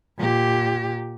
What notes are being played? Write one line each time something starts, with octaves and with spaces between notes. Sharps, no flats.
A#2 G4